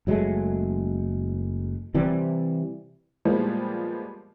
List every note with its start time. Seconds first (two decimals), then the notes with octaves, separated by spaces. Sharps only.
0.07 F#1 F#3 G#3 A3
1.94 C3 E3 G3
3.25 A#2 F3 G3 G#3 A#3 B3